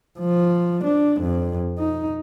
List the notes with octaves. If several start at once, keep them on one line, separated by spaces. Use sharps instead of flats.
F3
D4
F2
D#4